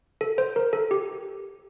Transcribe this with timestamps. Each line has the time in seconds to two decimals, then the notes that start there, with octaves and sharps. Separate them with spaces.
0.21 A4
0.38 C5
0.56 A#4
0.73 A4
0.91 G4